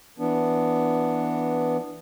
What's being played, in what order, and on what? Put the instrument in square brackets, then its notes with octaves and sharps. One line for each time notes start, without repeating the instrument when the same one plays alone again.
[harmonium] E3 B3 D4